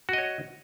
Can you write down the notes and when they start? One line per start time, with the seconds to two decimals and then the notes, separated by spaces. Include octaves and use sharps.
0.09 F#4
0.13 D#5
0.18 C#5